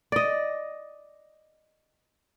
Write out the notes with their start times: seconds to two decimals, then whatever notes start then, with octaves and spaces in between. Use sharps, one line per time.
0.12 D5 D#5